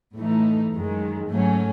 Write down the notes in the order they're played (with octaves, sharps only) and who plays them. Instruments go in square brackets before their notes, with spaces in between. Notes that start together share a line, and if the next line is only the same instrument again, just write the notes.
[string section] A2 E3 A3 D#4
F#2 D#3 G#3
G#2 F#3 A3 C#4